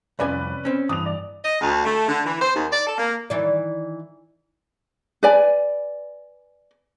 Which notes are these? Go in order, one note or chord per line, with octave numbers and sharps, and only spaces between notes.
C2 F2 C#4 B4 D5 G#5
C4 C#4
G2 E3 D#6 F7
D5
D#5
D2
A3
D3
E3
C5
D#2
D5
A4
A#3
D#3 E3 D5
B4 D5 G#5